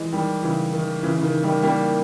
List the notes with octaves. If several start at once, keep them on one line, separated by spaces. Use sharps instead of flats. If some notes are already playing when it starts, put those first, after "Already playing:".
Already playing: E3 G#3
D#3 G3
C#3 E3
D#3
C#3 E3
C#3
D#3
D#3 G3
G3 A#3